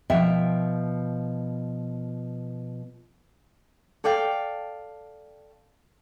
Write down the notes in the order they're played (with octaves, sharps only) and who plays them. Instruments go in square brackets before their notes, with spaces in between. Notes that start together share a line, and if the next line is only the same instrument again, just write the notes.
[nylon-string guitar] B2 F3 E5 G5
[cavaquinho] A4 D5 F5 G5